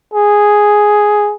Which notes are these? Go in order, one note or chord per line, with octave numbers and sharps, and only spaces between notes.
G#4